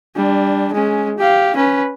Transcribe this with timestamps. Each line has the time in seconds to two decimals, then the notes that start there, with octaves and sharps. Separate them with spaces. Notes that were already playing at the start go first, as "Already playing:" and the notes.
0.16 G3 D4
0.73 G#3 C#4
1.18 G4 F5
1.56 C#4 B4